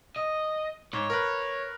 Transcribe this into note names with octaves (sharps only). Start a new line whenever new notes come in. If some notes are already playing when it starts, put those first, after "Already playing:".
D#5
G#2 C#5
A#4 B4